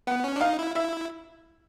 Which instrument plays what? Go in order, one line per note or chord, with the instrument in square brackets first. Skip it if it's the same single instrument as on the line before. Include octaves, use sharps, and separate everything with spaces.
[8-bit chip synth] B3 [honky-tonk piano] F#5
[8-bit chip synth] C#4
D4
[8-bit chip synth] D#4 [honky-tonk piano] F5
[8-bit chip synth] E4
[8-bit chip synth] E4 [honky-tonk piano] E5